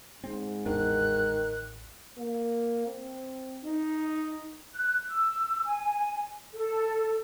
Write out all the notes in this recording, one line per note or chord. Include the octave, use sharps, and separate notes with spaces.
G#2 C4
A1 E2 D#3 D4 F#6
A#3
C4
D#4
F#6
E6
G#5
A4